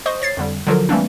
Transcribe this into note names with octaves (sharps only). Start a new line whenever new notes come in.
C5 D#5 C#6 D#6
C#5 A6 C7
F2 D3 G3
D3 F3 F#3 F4 A4 A#4
E3 G3 A3 A#3 C4 D4